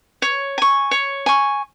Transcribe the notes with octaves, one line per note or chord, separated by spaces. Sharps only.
C#5
G#5 C#6
C#5
G#5 C#6